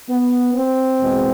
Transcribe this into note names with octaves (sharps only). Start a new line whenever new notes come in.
B3
C4
E2 B2 G#3